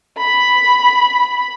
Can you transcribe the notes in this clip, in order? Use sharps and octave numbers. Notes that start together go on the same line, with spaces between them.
B5